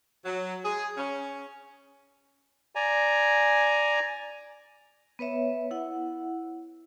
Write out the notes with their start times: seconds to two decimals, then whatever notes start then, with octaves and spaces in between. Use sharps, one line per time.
0.25 F#3
0.63 G#4
0.97 C#4
2.75 D5 G#5 A#5
5.19 B3 B4 C#5 E5
5.71 E4 F#5